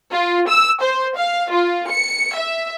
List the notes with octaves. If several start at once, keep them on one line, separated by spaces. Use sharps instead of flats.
F4
E6
C5
F5
F4
C#7
E5